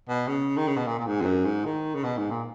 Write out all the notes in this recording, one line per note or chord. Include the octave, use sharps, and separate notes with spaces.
B2
C#3
D#3
C#3
B2
A#2
A#2
G#2
F2
F#2
G#2
D#3
C#3
B2
G#2
A#2